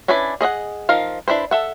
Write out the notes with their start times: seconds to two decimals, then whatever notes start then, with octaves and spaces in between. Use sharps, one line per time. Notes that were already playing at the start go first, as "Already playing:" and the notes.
0.08 C#4 D4 E4 B4 D5
0.41 G#4 D#5 E5 F#5
0.89 F3 D#4 A#4 F5
1.28 D4 E4 B4 C5
1.51 A4 E5 F#5